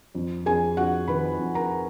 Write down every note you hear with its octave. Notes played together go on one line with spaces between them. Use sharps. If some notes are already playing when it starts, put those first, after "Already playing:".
F2
F2 G#4 G#5
F2 F#4 F#5
D#3 B4 B5
F2
A#4 A#5